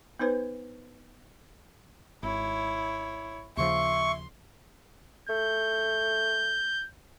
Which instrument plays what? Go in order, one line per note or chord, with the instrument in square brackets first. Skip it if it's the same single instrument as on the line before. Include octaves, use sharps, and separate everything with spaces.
[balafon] B3 D#4 B4 C5
[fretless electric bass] G#1 [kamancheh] E4 C#5
[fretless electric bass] D#2 C#3 F3 [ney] E5 [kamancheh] C6 [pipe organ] C#6
[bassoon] A3 [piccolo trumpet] G6